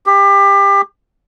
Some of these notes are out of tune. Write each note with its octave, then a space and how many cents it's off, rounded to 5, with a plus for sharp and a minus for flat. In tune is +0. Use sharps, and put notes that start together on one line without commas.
G4 +25